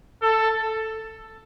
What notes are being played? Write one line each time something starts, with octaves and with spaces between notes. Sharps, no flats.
A4